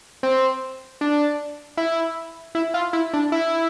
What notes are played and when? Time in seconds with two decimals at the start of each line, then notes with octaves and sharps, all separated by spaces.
0.23 C4
1.01 D4
1.77 E4
2.55 E4
2.74 F4
2.93 E4
3.13 D4
3.32 E4